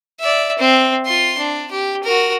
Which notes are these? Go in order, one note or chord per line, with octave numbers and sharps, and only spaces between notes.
D5 E5
C4
F4 C6
D4
G4
F#4 A#4